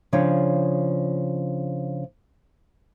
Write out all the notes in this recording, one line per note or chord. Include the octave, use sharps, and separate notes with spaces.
C#3 F3 D4 C#5